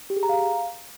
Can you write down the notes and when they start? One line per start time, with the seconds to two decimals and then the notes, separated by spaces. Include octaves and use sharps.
0.10 G4
0.16 G#4
0.23 A#5
0.29 F5